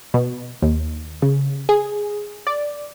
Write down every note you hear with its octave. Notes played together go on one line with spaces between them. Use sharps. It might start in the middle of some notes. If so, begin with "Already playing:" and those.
B2
D#2
C#3
G#4
D5